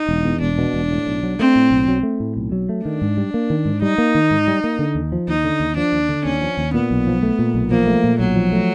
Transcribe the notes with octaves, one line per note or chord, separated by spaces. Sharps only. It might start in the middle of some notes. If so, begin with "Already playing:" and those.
Already playing: D#4
E1
E2
E1 D4
B2
E1
A2
B1
F#3
A3 C4
A2
B1
F#3
A3
A2
B1
F#3
A3
D#3 D4
G#2
G3
A#3
D#3
G#2
G3 D#4
A#3
D#3
G#2
G3
A#3
D3
D#2
F3
D#2 D#4
D3
D#2
F3 D4
D#2
D3
D#2 C#4
F3
D#2
A#2 B3
B1
F3
A3
A#2
B1
F3 A#3
A3
A#2
B1 F#3
F3
A3